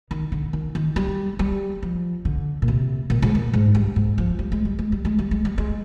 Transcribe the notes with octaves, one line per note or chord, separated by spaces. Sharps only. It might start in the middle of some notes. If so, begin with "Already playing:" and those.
D#3
D3
D#3
D#3
G3
G3
F3
D3
A#2
C3
A#2
G#2
A#2
G#2
G2
G#2
F3
G3
G#3
G3
G#3
G3
G#3
G3
G#3
G3
G#3